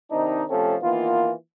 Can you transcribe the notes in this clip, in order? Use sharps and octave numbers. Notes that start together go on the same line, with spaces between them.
C3 D#3 C4 D4 D#4
C3 F3 A3 C4 C#4 A4
D#3 E3 A#3 B3 F4